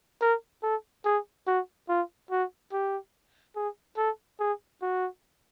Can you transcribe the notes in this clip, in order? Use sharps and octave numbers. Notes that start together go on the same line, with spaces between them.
A#4
A4
G#4
F#4
F4
F#4
G4
G#4
A4
G#4
F#4